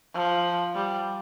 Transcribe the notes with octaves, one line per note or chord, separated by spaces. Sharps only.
F3
G3